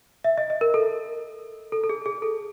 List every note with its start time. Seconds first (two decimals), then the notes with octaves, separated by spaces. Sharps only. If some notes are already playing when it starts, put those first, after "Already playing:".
0.24 E5
0.38 D#5
0.50 D#5
0.61 A#4
0.74 A4
1.72 A4
1.84 A4
1.89 G#4
2.06 G#4
2.22 A4